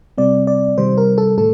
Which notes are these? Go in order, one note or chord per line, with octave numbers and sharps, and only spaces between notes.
C3 G3 C4 D5
D5
C3 D#3 G3 C5
A#4
A4
A2 A3 A4